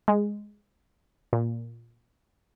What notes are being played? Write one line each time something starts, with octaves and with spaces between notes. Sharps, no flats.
G#3
A#2